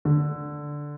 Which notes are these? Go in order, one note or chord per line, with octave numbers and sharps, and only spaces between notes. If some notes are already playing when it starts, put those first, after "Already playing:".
D3